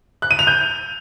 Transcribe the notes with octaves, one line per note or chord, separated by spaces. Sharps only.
F#6
D#7
F7
G6